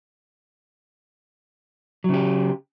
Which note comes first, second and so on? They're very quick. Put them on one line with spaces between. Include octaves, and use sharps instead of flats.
F#3 C#3 G4